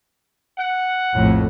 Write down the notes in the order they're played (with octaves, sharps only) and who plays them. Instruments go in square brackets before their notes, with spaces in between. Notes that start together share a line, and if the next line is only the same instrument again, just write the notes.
[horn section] F#5
[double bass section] A#1 F2 A2